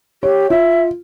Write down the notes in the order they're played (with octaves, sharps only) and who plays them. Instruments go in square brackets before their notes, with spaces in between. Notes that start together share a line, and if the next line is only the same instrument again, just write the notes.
[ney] G4 [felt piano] C#5
[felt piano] F4 [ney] E5